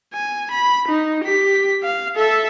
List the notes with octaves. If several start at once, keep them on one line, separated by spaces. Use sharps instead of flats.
G#5
B5
D#4
G4 B6
F5
A4 E5